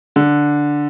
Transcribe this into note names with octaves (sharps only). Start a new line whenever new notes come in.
D3